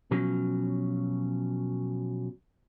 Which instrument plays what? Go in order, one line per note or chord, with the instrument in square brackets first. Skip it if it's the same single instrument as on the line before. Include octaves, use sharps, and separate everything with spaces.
[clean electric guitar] B2 F3 F#3 C#4